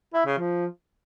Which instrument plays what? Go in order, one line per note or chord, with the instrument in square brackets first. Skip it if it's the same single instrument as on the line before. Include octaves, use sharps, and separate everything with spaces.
[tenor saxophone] E4
C#3
F3